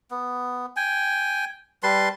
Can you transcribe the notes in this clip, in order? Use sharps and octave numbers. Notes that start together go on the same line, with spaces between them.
B3
G5 G#5
G3 B4 A5 C6